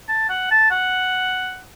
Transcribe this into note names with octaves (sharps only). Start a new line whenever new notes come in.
A5
F#5
A5
F#5